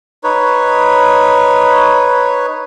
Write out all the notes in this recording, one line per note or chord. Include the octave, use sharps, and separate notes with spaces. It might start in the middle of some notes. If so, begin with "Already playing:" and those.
D#4 B4 C#5